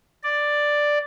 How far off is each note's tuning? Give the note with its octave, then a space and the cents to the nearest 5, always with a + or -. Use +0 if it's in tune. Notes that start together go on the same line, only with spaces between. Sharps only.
D5 +5